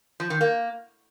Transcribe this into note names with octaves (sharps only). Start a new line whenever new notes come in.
F3
D#3
A#3